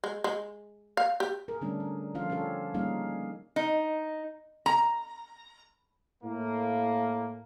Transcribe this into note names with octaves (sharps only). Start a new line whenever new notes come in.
G#3
G#3
F5
G4
G#4 A#4
D3 G3 A3 C#4 D4
C#4
F3 C#4 F4 A4 F5
C#4 D4 G4 A4 C#5
G3 A#3 C#4 D#4 G#4 F5
D#4
A#5
A2 A#3